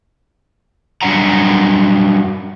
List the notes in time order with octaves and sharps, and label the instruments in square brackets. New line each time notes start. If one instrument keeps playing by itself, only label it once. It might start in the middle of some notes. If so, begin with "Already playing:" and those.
[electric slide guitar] F#3 G3 D4 D5 F#5 A#5